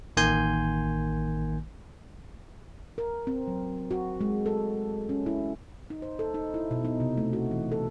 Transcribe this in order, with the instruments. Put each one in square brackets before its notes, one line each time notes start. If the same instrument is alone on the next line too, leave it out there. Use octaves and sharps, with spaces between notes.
[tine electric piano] A1 D#3 A#3 G#5 C6 G6
[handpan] A#4
C4
F#3
F#4
G#3
A4
C#4
E4
D#4
C5
A4
D#4
E4
B2
D#4
C3
A3
F#4
E3
A4